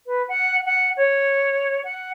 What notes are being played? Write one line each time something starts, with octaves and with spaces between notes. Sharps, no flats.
B4
F#5
F#5
C#5
F#5